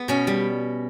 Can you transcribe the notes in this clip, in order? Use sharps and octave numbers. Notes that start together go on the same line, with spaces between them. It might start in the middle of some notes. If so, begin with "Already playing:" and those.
Already playing: B3
B2 C#4
G3